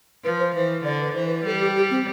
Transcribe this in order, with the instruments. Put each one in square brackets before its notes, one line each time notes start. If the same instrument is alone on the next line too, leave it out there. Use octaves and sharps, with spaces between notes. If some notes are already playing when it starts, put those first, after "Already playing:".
[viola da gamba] F3 [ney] B4
[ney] C5
[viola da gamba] E3 [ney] C5
[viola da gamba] D3 [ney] D5
[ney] B4
[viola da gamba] E3 [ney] C5
[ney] B4
[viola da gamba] G3 [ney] A4
[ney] G4
G4
C4